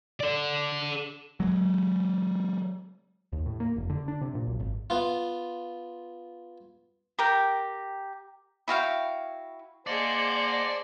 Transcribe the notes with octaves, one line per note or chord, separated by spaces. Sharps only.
A4 D5
F#3 G#3
D#2
A2
A#3
F1
D3
D4
C3
A#2
B1
G#1
B3 F4
G4 A#4 G5
E4 F#4 F5 G5
A#3 G#4 C5 D5 D#5 F#5 A5